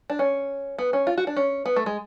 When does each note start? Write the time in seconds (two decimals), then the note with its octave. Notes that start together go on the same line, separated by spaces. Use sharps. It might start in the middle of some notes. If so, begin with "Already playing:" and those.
0.10 D4
0.19 C#4
0.78 B3
0.93 C#4
1.07 F4
1.18 F#4
1.27 D4
1.37 C#4
1.66 B3
1.76 A3
1.86 G#3